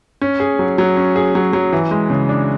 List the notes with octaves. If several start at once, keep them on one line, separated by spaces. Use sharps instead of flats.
C#4
G#4
F#3
F#3
C#4
G#4
F#3
F#3
E3
G#3
C#3
D4